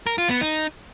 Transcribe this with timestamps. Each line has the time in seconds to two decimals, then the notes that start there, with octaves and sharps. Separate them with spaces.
0.07 A#4
0.18 F4
0.30 B3
0.41 D#4